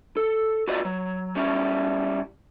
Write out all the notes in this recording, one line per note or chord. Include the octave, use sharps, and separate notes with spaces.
A4
F4 F#4 B4 D5 D#5
F#3
G3 C#4 E4